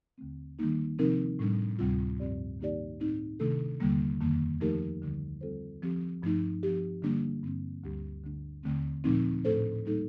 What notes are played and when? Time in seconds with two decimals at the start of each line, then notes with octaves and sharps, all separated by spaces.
0.18 D#2 D3 A3 C4
0.59 D#3 G3 A#3 D#4
0.99 C3 F3 C4 D#4 A#4
1.39 A2 G3 D4
1.79 D2 C3 G3 C4 F4
2.19 G2 F3 C4 G4 D5
2.60 D#3 A#3 D#4 G4 D5
3.00 A2 A3 C4 D#4
3.40 C3 D#3 A3 D4 A4
3.80 D#2 D3 G3 A#3
4.20 F2 D#3 A#3
4.60 F3 A3 D#4 G4 A#4
5.02 D2 D3 G3
5.41 G3 C4 F4 A4 C5
5.82 F3 C4 G4
6.23 G2 F3 A3 D#4
6.63 F3 C4 G4
7.02 D3 G3 A#3 D4
7.43 G2 D3 G3 C4
7.84 D2 D3 G3 D4 G4
8.24 D2 D3 A3 D4
8.63 D#2 D3 A3 C4
9.04 A#2 F3 A3 C4 D#4
9.45 A2 A3 D4 A4 C5
9.85 G3 A#3 D#4 A4